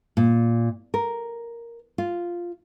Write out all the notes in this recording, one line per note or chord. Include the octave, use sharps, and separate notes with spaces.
A#2
A#4
F4